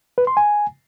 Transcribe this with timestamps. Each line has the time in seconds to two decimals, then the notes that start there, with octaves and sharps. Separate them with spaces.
0.18 B4
0.27 C6
0.37 G#5